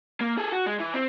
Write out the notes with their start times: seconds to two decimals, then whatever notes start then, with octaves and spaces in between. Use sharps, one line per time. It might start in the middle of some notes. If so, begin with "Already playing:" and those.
0.21 A#3
0.37 G#4 A4
0.52 F#4
0.66 G#3
0.79 E3
0.94 C4